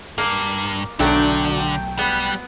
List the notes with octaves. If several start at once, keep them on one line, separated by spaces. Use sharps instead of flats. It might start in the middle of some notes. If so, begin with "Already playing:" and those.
G2 A#3
B1 D3 F#3 A3 D4 F#4 G5
G3 B3 F#6